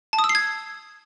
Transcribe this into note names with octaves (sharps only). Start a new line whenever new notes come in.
A5
D#6
E6
C7
G#6